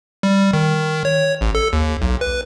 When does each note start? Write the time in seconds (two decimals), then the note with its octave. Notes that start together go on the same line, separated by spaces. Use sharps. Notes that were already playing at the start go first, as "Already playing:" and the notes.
0.23 G3
0.53 D#3
1.05 C#5
1.41 A1
1.55 A4
1.73 D#2
2.02 B1
2.21 B4